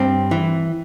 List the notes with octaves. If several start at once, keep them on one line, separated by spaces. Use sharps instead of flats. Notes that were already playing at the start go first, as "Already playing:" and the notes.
Already playing: G2 C4
E3